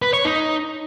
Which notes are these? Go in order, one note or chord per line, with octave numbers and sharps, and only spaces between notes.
B4
C#5
D#4